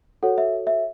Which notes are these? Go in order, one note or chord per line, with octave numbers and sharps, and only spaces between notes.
F#4 A4 C#5 F#5
E5
E5